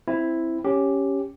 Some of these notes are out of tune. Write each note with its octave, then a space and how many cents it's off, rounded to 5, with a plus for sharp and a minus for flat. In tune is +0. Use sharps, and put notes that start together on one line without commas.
C4 +0 E4 +0
C#4 +0 G4 +0